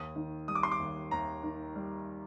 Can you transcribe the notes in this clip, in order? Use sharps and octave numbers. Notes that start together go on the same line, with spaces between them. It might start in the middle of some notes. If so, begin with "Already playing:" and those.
Already playing: D#2 D#6
D#3
G3 D#6
D6
C6
D6
D#2
D#2 A#5
D#3
G3